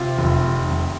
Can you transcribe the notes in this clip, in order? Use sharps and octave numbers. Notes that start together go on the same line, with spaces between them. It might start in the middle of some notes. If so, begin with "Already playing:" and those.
Already playing: C3 F4
F1
C3
F1